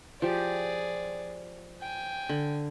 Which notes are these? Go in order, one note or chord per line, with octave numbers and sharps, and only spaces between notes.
F3 G4 G#4 D5
G5 G#5
D3